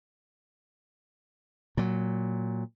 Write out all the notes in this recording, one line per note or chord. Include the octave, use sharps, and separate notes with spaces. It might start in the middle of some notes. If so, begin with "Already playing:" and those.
A#2 F#3